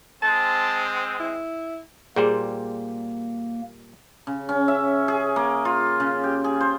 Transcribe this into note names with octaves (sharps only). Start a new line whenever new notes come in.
G#3 C4 A5
E4
A#2 G3 A#3 G#4 C5 G5 C6
C#3
C#4
E5
G#4
A#3
F4
C#3
G4
G#4
C5